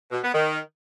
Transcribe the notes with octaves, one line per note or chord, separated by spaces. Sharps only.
B2
B3
D#3